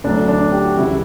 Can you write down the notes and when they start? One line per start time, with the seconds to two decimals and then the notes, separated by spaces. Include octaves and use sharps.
0.04 D2 D3 F#3 D4
0.28 D4
0.52 G4
0.65 F#4
0.76 C#2 C#3 E3 G3 E4